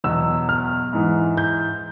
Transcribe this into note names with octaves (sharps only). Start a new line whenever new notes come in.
E2 B2 F#3 E6
F6
G#2 E3
G6